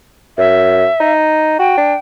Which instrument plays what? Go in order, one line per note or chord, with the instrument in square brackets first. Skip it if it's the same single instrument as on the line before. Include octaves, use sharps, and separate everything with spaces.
[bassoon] F#2 [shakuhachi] E5
[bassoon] D#4
[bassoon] F#4 [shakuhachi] G5
[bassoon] D4